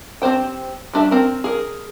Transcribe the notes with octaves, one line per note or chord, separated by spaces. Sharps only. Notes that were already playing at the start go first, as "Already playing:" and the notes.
C4 G4 C5 G5
G3 D4 E5
C4 A#4
G#4 A#4